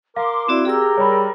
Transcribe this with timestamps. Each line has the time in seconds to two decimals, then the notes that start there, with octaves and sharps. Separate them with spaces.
0.16 A#4 F5 C6 D6
0.48 C4 E4 F#4 D5
0.65 G4 G#4 A#4 E6
0.98 G3 C#5 B5